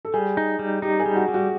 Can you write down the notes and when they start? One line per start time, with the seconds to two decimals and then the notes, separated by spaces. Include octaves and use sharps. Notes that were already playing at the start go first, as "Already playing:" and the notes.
0.05 A4
0.14 G3 G#4
0.37 D#4
0.59 G3
0.82 D#4 G4
1.00 G#4
1.06 G3
1.16 F#4
1.28 G3
1.34 F#4